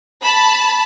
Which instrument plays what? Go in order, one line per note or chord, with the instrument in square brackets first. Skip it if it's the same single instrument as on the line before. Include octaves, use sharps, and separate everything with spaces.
[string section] A5 B5